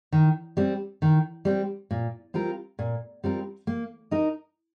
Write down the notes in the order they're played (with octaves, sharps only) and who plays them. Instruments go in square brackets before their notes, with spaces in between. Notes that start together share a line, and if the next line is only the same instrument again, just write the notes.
[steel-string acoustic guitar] D#3
G3 C4
D#3
G3 C4
A#2
G3 C4 F4 A#4
A#2
G3 C4 F4 A#4
A#3
D#4 A#4 D#5